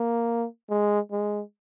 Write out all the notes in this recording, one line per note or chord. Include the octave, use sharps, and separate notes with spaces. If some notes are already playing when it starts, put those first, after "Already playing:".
Already playing: A#3
G#3
G#3